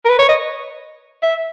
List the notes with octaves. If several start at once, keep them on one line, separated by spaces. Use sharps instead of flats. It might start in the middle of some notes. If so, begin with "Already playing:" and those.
A#4
B4
C#5
D#5
E5